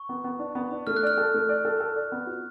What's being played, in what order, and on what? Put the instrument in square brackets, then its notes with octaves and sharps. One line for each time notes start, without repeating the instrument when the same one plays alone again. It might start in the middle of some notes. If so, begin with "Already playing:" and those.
Already playing: [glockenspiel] C#6
[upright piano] B3
B3
D4
B3
D4
[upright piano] A3 [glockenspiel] F6
[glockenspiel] F#6
[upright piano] D5 [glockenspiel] F6
[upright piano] A4
A3
D5
A4
A4
D5
B3
F#4